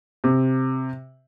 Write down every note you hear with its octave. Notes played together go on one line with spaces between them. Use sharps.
C3